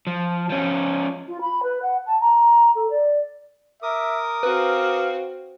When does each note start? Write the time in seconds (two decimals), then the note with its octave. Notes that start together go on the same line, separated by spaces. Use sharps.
0.07 F3
0.50 F3 C#4
1.28 F4
1.41 B5
1.63 B4
1.82 F#5
2.06 A5
2.20 A#5
2.75 A4
2.90 D5
3.83 A#4 E5 D6 D#6
4.43 C4 F#4 B4 F5